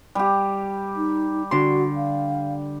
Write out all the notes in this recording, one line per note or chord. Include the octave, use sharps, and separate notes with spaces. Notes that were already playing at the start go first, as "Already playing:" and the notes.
G3 G4
D#4
D3 F#4 C6
F5